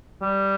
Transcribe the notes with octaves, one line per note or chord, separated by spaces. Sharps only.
G3